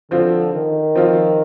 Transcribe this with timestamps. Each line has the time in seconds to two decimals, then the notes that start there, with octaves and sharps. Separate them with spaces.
0.11 D3 F3 C4 F4
0.53 D#3
0.95 F3 C4 F4